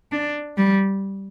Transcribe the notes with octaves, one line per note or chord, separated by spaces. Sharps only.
D4
G3